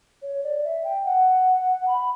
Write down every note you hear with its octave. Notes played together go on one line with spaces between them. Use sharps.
C#5
D5
E5
G5
F#5
B5